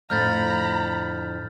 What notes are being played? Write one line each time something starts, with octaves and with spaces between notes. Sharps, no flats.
F2 A2 D3 A#5 B5 F6 G6 A6